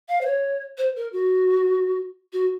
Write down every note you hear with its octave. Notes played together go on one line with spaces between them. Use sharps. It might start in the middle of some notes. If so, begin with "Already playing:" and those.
F5
C5
C#5
C5
A#4
F#4
F#4